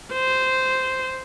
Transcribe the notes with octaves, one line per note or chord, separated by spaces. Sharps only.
C5